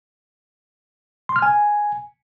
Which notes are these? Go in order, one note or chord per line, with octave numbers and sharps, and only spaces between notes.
C6
F6
G#5